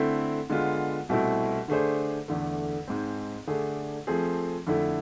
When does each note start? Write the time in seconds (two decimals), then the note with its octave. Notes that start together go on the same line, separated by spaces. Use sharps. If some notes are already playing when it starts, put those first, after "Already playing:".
Already playing: D3 A3 C4 E4
0.49 D3 G#3 B3 F4
1.09 C2 B2 A3 C4 E4
1.68 D3 A3 D4 G#4 C5
2.28 E2 D3 A3
2.87 G#2 G#3 C4
3.47 D3 A3 D4 G#4
4.07 F3 A3 C4 G#4
4.67 F2 D3 A3 E4